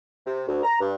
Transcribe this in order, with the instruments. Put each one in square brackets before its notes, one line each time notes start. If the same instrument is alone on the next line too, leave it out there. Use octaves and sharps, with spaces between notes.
[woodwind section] C3
D2
A#5
G2